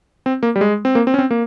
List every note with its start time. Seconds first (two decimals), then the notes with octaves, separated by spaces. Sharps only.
0.26 C4
0.43 A#3
0.56 G3
0.61 G#3
0.85 C4
0.95 A#3
1.07 C4
1.14 C#4
1.18 C4
1.31 A#3